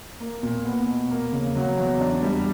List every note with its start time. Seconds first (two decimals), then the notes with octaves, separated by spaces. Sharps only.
0.20 A#3
0.43 A#2
0.65 B3
0.87 B2
1.10 A#3
1.33 C#3
1.56 F#3
1.77 E2
2.01 D4
2.23 G3